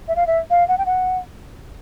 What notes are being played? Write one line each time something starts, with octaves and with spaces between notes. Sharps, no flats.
E5
F5
E5
F5
F#5
G5
F#5